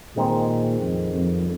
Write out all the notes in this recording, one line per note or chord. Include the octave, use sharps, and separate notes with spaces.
A#2 D#3 G#3 C4 D#4 G#4
F2
F2